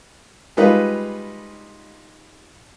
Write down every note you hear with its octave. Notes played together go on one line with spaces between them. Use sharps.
G3 G#3 D#4 F4 B4